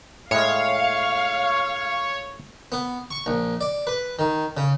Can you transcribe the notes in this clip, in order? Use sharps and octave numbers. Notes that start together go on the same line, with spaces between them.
A2 G#3 C#5 F5
B3
C#6
A#1
D5
B4
D#3
C#3